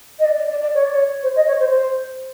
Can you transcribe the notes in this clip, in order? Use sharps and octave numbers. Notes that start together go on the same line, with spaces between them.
D#5
D5
D5
D5
D5
C#5
D5
C#5
C5
D#5
C#5
C5
C5